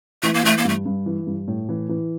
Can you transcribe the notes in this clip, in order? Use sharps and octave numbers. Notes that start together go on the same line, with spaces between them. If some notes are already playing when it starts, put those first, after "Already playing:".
E3 A3
A#3
E3 A3
A#3
G2 A3
G2
E3
G2
A2
E3
E3